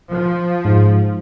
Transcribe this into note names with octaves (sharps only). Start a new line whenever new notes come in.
F3
G#2